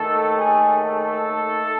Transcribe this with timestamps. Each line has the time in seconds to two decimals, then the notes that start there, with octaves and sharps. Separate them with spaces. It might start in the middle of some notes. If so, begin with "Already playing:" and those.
Already playing: D#2 D#3 A3 A4
0.35 G#4
0.79 A4